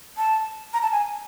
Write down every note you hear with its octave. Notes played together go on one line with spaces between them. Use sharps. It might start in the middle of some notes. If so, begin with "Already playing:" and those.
A5
A#5
A5
G#5